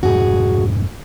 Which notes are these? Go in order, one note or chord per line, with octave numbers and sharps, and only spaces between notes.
F2 G#2 C3 F#4 G#4